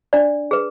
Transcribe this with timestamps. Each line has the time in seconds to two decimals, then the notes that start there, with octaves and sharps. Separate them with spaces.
0.13 D4 D5
0.51 G#4 B4